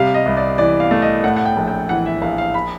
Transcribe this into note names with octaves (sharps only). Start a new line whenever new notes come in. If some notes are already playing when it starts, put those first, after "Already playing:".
Already playing: C3 G3 F5
D#5
C2
D5
E3 D5
F5
A3
D#5
A2 F#5
F#5
G5
A#1
G5
E3 F#5
E5
A#1 F5
F5
B5